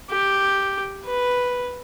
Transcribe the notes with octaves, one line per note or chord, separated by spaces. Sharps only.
G4
B4